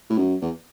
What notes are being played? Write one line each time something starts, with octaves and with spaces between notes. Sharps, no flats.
A2
F#2
E2